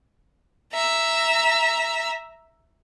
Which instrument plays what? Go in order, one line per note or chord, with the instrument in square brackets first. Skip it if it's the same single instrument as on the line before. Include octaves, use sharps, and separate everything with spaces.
[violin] E5 A#5